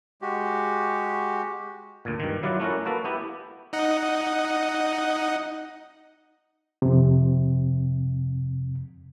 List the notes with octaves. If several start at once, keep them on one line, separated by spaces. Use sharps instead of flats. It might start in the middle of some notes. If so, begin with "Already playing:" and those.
G#3 F#4 G4
D2 A#2
G2 D#3
F#3 E4 F4 D5 F#5
A3 C#4 E4 F#4 A#4
A#3 F#4 A4 B4
B3 E4 G4
D#4 D#5 F#5
F2 C3